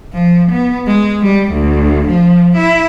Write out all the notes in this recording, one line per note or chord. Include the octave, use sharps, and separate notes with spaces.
F3
B3
G#3
G3
D2
F3
E4